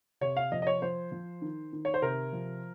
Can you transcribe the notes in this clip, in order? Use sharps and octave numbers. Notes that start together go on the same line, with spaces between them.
C3 C#5
F5
F3 D#5
D#5
C#5
F3 C5
F3
D#3
D#3
C#5
C5
C3 A#4
F3